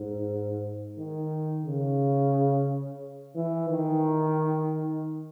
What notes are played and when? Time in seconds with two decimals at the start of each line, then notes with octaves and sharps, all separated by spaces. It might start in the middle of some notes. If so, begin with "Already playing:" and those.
Already playing: G#2
0.98 D#3
1.65 C#3
3.36 E3
3.70 D#3